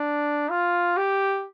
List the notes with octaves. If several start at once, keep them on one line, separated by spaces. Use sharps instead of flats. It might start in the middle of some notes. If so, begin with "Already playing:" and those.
Already playing: D4
F4
G4